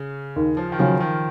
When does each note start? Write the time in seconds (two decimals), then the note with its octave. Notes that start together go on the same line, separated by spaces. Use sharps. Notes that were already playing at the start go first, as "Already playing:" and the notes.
Already playing: C#3
0.36 D#2
0.57 F3
0.72 D#3
0.79 C#3 F3 F#3
1.00 D#3